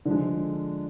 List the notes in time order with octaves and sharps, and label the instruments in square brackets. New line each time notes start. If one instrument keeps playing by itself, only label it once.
[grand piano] D3 F3 G#3